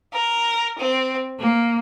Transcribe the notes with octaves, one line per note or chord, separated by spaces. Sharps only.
A#4
C4
A#3